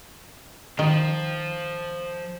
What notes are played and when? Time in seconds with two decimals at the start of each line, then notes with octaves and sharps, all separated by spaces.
0.79 D#3 F3